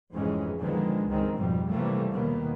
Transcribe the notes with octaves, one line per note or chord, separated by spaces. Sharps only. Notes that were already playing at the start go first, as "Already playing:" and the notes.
F1 F2 G#2 E3 G#3 C#4
A#2 D3 D#3 F3 G#3 B3
C#2 G2 D#3 G#3 C4
F2 G#2 B2 F3 G3
C3 E3 F3 G3 A3 A#3
D#2 B2 D#3 A#3 B3